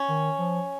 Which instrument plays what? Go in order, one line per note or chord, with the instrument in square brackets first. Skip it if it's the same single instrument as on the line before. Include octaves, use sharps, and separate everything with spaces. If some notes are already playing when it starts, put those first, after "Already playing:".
Already playing: [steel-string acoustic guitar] C#4
[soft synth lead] D#3
F3